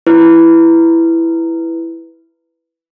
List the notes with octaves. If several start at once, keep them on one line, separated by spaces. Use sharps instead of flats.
E4 B4